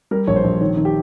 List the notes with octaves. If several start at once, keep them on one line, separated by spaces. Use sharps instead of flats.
G3 A#4
A#1 C#5
C5
A#1
D#3 C#5
D#3
G4